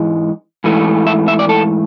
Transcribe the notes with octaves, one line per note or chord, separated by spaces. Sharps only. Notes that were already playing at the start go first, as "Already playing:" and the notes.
Already playing: G#2 E3 G#3
G#2 E3 A3
E5
E5
D5
A4